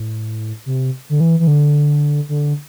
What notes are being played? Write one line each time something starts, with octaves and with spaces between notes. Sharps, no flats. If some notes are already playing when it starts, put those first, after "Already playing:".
Already playing: A2
C3
D3
E3
E3
D3
D3